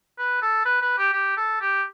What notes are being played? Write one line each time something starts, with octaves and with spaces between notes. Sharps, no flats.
B4
A4
B4
B4
G4
G4
A4
G4